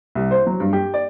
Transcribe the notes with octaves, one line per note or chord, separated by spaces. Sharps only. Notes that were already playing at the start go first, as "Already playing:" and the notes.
C2
C5
F#3
G2
G4
D5